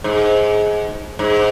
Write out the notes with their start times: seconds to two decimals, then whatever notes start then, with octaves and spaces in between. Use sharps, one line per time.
0.04 G#2
1.19 G#2